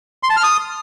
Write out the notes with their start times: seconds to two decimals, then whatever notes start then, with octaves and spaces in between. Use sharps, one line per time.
0.23 C6
0.30 A5
0.37 F6
0.43 D#6